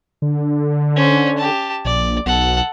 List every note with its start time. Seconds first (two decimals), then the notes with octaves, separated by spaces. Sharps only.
0.22 D3
0.96 C#4 C5
1.37 G4 A5
1.85 A#1 D5
2.26 B1 A4 F#5